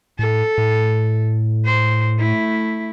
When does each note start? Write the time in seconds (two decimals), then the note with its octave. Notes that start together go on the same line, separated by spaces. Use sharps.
0.19 A2 A4
0.58 A2
1.65 C5
2.19 A3 E4